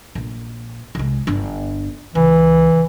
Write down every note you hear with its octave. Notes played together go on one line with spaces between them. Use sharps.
A#1
C2 G#3
G1 D4
C#2 E3